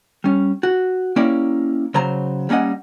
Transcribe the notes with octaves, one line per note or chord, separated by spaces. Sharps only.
G3 C#4
F#4
A#3 C#4 E4 G4 D5
C#3 F#3 C5 A#5
G3 A#3 C#4 D#5 F#5